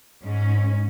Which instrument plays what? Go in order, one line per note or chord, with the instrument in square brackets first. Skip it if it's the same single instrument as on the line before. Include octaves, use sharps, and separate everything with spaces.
[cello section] G#2 C#4